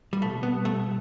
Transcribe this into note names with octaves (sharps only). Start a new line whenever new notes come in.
G3
B2 A3
B3
G3
A3